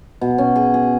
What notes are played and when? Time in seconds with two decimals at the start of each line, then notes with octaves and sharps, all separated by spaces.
0.21 B2
0.38 C#4
0.56 G#4
0.74 G#4